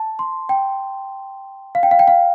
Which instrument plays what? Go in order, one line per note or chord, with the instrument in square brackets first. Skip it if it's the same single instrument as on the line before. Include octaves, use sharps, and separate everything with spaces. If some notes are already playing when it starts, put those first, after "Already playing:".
Already playing: [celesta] A5
C6
G5
F5
G5
F5
G5
F5